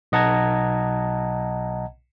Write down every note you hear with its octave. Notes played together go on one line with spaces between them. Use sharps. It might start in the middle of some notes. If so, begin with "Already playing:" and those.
B1 D#5 F#5 A5 A#5 G#6